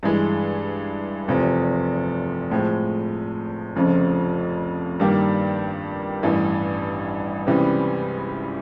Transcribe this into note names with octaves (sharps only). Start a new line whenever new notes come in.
G2 E3 G#3
F1 E2 C3 F3
A2 F3 G#3
F1 F2 C#3 F3
G2 D#3 G3 A#3
A1 G2 E3
C#2 C3 E3 G3 B3